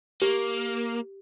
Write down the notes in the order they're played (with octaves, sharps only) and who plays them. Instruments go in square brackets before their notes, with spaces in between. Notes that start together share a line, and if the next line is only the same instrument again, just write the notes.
[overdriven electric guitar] A#3 [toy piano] G4